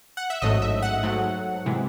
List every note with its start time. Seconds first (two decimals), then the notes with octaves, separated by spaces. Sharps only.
0.17 F#5
0.30 E5
0.42 A1 G#2 F#3 A3 D#5
0.62 E5
0.82 F#5
1.03 G#2 F#3 A3
1.66 C3 E3 G#3